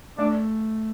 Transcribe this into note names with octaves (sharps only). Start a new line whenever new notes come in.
A3 D4